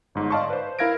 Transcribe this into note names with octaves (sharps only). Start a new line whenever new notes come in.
G1 G#2
D5 D#5 F5 A5 C6 C#6
B4 C5
E4 A#4 F5 G#6 A#6 D7